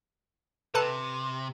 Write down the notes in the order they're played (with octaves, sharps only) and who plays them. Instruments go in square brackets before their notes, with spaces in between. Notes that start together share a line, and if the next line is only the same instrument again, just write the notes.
[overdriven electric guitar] C3 [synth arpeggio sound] A4 B4 A5